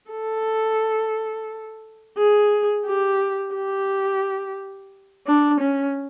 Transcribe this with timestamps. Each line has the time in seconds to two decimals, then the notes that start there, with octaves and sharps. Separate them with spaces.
0.11 A4
2.18 G#4
2.86 G4
3.55 G4
5.27 D4
5.61 C#4